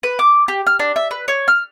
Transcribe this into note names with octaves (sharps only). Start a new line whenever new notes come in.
B4
D6
G4
F6
D4
E5
B4
C#5
F6